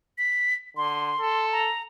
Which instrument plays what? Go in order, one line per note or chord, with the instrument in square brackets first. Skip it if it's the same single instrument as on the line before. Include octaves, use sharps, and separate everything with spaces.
[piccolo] B6
[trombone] D3 [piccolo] C6
[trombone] A4
[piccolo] A#5